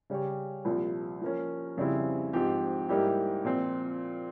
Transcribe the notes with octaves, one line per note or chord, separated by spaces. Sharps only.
C#3 G3 C#4 G4 C#5
C2 A#2 F3
F3 A#3 C#4
F2 C#3 G3 C4 E4
G#2 F3 C4 G4
G#2 G3 A#3 E4 G4
A#2 F3 C4